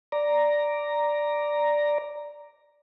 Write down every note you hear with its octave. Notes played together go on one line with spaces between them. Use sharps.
D5 A#5